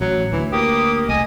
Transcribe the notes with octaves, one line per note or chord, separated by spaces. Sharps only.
A1 F#3
D2 E3
A#3 G4 D#6
E1 C2 A3 D#5 G#5